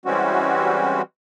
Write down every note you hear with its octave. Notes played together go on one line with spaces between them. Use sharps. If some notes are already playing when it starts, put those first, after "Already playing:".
E3 G3 G#3 C4 C#4 F#4